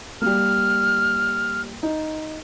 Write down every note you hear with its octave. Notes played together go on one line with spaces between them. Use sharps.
G3 A#3 F6
D#4